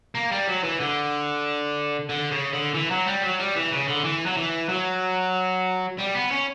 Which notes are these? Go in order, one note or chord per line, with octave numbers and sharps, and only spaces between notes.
A#3
G3
F#3
E3
D3
D3
C#3
D3
E3
F#3
G3
F#3
G3
E3
C#3
D3
E3
F#3
E3
F#3
G3
B3
C#4